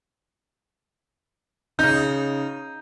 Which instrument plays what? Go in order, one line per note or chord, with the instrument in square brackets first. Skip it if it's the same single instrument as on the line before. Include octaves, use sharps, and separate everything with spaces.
[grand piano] C#3 G6 [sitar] D#4